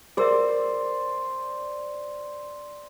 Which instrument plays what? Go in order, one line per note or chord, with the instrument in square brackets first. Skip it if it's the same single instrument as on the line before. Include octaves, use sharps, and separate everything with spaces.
[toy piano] G#4 A#4 E5 [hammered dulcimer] C5 D5